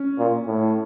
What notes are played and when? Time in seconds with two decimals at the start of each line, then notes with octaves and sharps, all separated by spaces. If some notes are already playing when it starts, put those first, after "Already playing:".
Already playing: C#4
0.18 A#2
0.47 A2